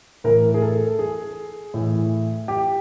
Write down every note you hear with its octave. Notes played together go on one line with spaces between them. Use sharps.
A2 E3 A#4
G#4
A4
G#4
A2 E3
G4